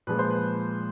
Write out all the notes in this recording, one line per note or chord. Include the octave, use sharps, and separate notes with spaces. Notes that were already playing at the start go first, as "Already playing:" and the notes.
A#2 F3 G#3 B4
C5
B4